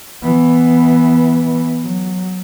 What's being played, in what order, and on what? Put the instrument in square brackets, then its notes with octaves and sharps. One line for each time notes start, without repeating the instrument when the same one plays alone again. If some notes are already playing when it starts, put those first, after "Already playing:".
[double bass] E3 B3
F#3